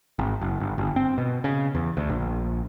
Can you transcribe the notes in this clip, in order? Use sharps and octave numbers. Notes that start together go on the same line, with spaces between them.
G#1
F#1
G1
G1
C4
B2
C#3
E2
D2
A#1